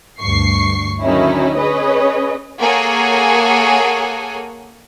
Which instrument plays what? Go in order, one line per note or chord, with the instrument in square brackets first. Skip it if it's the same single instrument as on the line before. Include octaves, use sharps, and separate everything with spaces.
[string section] D2 G2 C#6 C7
D3 D#3 F#3 C#4 D#4 E4
C#4 G#4 B4 C#5 D#5
[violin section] A#3 G#4 A4 C#5 F#5 G#5